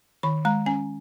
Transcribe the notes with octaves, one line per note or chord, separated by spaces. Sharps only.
D#3 B5
G#3 A#5
C#4 G#5